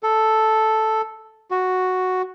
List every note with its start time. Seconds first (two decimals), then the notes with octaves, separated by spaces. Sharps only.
0.03 A4
1.51 F#4